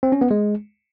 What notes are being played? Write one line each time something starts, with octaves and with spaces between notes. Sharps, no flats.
C4
C#4
B3
G#3